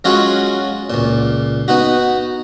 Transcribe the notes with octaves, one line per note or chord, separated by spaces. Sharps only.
F#3 G#3 C#4 F4 F#4 G#4
C#2 A#2
B3 D#4 F#4